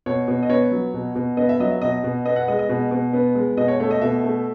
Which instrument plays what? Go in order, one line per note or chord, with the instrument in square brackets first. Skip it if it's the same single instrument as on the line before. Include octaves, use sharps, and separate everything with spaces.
[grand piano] B2 C#5
B2
D#5
B3 C#5
F#3
B2
B2
B3 D#5
E5
F#3 D#5
E5
B2 D#5
B2
B3 D#5
F#5
G#3 D#5
D#5
B2
B2
B3
G#3
B2 D#5
C#5
A3 C#5
D#5
B2 E5
A3